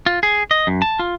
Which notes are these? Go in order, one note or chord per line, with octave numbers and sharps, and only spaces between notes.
F4
G#4
D#5
F#2
A5
F4